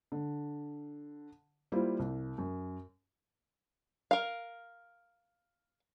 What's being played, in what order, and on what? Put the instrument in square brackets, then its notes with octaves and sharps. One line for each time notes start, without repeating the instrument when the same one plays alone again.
[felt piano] D3
G3 A#3 E4 F4 C5
C2
F#2
[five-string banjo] A#4 F5